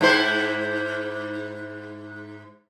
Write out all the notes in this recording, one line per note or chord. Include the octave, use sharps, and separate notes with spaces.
G#2 E4 C5